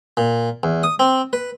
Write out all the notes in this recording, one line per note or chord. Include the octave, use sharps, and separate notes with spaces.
A#2
E2
D#6
C4
B4